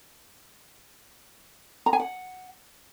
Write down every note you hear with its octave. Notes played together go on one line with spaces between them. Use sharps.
A#5
G#5
F#5